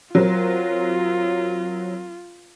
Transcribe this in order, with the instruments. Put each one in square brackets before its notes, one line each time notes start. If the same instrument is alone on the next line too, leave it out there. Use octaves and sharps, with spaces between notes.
[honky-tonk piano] F#3 C4 A#4 [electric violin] F4